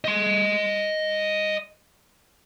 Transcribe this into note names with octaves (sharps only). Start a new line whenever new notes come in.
D#5 C6